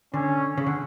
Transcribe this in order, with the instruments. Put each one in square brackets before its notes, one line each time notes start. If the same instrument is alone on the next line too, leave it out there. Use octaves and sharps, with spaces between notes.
[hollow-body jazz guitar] D3 [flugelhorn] C#4
[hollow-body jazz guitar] C#3
D3